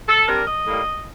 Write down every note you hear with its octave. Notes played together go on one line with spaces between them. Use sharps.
A4
C3 G3 D4 A#4
D#5
A2 G3 A#3